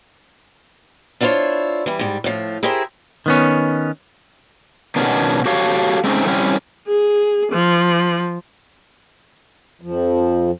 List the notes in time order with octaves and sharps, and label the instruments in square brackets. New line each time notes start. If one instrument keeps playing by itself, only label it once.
[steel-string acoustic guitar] D4 E4 F4 A#4 C5 C#5
E3 G3
G#2 G3
A2 F3
E4 G4 G#4 A#4 C5
[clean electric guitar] D#3 B3 C#4
[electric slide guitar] B2 D#3 B3 C#4 D4
F#4 G4 A4 C#5 F5
G#3 A3 C4 C#4 D#4
G3 C4 C#4 E4
[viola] G#4
F3
[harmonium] F2 F3